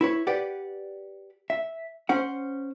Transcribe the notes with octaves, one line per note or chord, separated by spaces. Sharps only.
E4 B4 C#5
G4 B4 D5 F#5
E5
C#4 C5 F#5